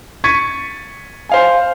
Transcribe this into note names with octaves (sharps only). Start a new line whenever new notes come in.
C#6 G#6 A6 B6 C#7 D#7
C5 F5 G#5